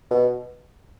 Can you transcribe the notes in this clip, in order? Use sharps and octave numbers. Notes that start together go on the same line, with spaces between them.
B2